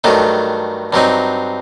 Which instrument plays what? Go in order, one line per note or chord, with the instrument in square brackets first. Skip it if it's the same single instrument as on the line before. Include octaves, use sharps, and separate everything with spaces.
[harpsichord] G2 D#3 F#3 A3
G2 F#3 C4 D#4